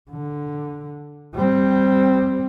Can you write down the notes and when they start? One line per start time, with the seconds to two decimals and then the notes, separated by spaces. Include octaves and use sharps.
0.11 D3
1.34 G3 C4